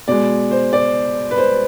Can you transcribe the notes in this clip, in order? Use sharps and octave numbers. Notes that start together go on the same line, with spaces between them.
B2 G#3 D5
C5
D5
B4
C5